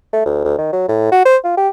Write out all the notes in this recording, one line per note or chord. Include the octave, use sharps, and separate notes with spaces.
A3
D2
D2
D#3
F#3
A2
F#4
C5
F4
G4